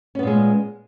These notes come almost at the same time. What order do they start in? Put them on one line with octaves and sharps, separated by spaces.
C#4 B3 A#2 G#3